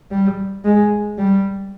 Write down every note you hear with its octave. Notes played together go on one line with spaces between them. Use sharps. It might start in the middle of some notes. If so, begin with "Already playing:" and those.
G3
G#3
G3